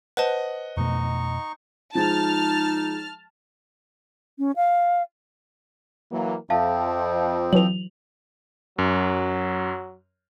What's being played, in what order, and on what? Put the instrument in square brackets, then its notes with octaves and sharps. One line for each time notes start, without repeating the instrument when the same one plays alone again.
[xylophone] B4 C5 A5 [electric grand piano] D#5 F#5
[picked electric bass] F2 B2 A3 [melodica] D#4 C#6
[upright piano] F3 G#3 [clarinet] D#4 [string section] A5 F6
[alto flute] C#4
F5
[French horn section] E3 F#3 A#3
[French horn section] F2 [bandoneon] F3 C4 [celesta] E5 F5 A5
[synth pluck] E3 F#3 [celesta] F7 F#7
[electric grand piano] F#2 [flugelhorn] F#3